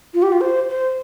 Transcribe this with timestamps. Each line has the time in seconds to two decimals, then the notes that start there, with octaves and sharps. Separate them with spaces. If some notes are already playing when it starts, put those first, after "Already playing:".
0.14 F4
0.22 G4
0.32 F4
0.41 C5
0.69 C5